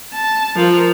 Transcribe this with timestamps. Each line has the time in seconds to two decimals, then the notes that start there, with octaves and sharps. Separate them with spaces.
0.13 A5
0.56 F3 A#4